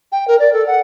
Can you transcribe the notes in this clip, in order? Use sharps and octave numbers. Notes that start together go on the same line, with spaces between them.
G5
A#4
D5
A4
F#5